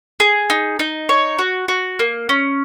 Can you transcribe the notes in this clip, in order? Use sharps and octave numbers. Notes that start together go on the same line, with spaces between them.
G#4
D#4
D#4
C#5
F#4
F#4
A#3
C#4